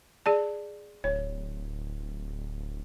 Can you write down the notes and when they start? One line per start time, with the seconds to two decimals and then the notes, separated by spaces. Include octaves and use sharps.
0.26 G#4 D5 A5
1.04 D1 C#5